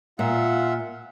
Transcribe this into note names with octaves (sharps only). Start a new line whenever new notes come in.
A#2 F4 E5 F#5